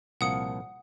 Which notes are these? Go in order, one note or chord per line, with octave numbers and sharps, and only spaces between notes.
C2 A#2 F3 F#5 D#6 C#7